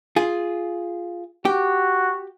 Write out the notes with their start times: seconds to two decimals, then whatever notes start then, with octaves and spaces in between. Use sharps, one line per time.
0.16 F4 G#4
1.45 F#4 G4